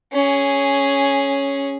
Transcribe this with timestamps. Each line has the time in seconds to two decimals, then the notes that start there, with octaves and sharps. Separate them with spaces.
0.13 C#4 G#4